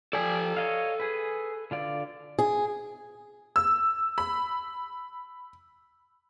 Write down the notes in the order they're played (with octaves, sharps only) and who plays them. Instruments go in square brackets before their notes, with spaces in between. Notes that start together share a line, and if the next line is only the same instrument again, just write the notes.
[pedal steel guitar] F3 G4 D5 [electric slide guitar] A4 G#5
[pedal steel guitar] C#5 D#5 F5
G#4 B4
D3 F4 D5
[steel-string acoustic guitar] G#4
[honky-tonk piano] E6
B5